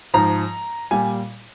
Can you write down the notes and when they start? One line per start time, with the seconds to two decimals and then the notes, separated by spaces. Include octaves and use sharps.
0.14 G#2 F3 A#5
0.91 A#2 G3 G#5